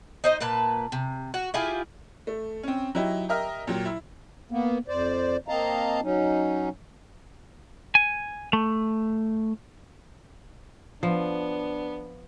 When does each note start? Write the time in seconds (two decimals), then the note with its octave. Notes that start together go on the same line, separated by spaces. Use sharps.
0.24 D#4 C5 D#5
0.40 A#2 A#3 B4 A5
0.92 C3
1.34 F#4
1.54 E4 F4 G4 G#4
2.27 A3
2.63 C4 C#4
2.95 F#3 D#4 E4 G4
3.29 G4 A#4 D#5 E5 A#5 F6
3.67 A#2 F#3 G4
3.85 E4
4.51 A#3 B3
4.88 F2 C5 D5
5.48 A#3 C4 D#5 F5 A5 A#5
6.02 F#3 C#4 D#4
7.95 G#5
8.53 A3
11.03 F3 B3 D4